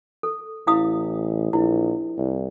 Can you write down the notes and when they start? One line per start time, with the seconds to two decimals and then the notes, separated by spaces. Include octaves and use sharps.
0.23 A4
0.67 A1 E4 F5 D#6
1.53 A#1 E4
2.18 C2